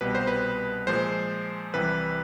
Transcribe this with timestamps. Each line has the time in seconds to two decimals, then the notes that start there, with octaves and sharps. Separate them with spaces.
0.01 C2 B2 G3 B4
0.15 C5
0.27 B4
0.87 A#2 F3 G#3 C5
1.74 C2 C3 E3 G3 B4